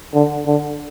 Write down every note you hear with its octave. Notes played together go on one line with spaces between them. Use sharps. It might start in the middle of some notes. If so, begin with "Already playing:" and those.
D3
D3